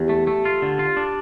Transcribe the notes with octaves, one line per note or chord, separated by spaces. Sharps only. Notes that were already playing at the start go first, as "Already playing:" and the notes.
Already playing: E2 G4
A3
A3
F4
D3
F4
D4